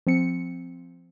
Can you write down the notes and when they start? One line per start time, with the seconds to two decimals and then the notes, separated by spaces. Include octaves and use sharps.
0.07 F3 C4 C#7